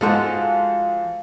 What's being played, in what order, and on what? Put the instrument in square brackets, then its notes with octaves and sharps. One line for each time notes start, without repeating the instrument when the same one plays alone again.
[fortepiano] G#2 A4 [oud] F3 G#3 F#4